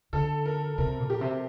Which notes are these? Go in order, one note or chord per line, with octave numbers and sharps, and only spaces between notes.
D3 A4
A#4
C3 A#4
A#2
G4
C3